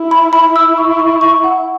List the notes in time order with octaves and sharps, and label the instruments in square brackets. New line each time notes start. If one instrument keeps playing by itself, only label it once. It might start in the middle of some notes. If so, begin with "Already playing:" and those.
Already playing: [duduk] E4
[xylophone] B5
B5
E6
C#6
C#6
C#6
F#5